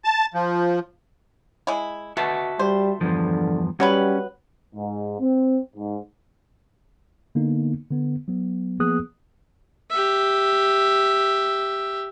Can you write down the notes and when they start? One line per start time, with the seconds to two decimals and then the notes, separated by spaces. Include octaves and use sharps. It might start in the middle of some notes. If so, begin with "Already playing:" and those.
0.04 A5
0.34 F3
1.67 G#3 E4
2.17 B2 F#4 E5 A5
2.59 G3 C5
3.01 E2 G2 D3 F3
3.80 F#3 G3 B3 C#4 B4
4.75 G#2
5.19 C4
5.76 G#2
7.35 D3 A#3 B3 D#4
7.91 D3 B3
8.28 F#3 B3
8.80 F3 A#3 B3 G#4 D#6 F#6
9.91 G4 E5